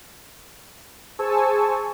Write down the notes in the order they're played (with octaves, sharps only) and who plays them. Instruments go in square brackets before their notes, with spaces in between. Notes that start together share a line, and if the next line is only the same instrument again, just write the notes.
[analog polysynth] G#4 C5 G#5 A5 C#6 E6